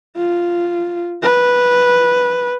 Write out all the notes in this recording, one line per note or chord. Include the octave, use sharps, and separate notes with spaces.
F4
B4